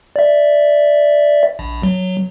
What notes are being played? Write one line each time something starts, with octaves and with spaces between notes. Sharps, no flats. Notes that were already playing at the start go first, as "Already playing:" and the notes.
D5 E5
A#1
F#3